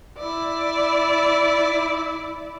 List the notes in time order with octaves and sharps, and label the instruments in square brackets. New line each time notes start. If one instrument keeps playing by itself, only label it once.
[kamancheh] E4 D5